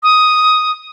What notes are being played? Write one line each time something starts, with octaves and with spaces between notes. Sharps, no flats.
D#6